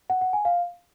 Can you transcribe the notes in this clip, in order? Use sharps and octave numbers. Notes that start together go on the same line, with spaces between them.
F#5
F#5
G#5
F5